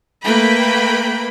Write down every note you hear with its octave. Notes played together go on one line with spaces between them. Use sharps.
A3 A#3 B4 G5 B5